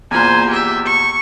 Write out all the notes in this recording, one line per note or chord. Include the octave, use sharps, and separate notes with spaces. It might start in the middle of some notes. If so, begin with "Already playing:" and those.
E2 A#2 C5 G#5
G4 E5
C#6